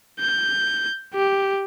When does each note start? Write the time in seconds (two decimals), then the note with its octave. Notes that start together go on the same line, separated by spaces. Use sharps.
0.20 G6
1.14 G4